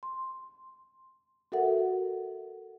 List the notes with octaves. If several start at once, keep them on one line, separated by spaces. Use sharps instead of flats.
C6
F#4 A4 A#4 E5 F#5